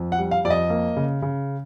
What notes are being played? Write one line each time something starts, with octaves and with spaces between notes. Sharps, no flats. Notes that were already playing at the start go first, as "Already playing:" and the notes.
Already playing: F2
F#5
G3
F5
F2 D5
D#5
A#3
C#3
C#3